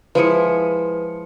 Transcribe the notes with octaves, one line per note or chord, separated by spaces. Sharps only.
F3 G#3 E4 B4 C#7